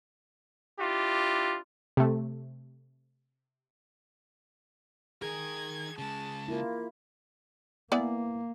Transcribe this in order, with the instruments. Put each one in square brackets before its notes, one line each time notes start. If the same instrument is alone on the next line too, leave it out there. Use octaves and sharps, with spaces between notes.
[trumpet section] D4 E4 F4 G4
[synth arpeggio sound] C3 A3
[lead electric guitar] D#3 A#4 [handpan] G#4 [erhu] G#6
[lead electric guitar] C#3 G#3 [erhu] A5
[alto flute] A#3 [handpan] E4 F4
[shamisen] E3 B3 D5 [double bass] A#3